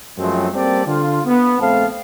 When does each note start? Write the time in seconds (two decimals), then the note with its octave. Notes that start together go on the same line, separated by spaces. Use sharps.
0.18 F#2 F3 F#3 G#3 A3 C4
0.54 G3 A#3 C4 G4 A4 D5
0.86 D3 F4
1.25 B3
1.60 A#1 A3 C4 F5 A5